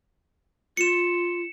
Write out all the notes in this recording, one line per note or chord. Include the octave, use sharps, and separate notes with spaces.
F4 C#7 E7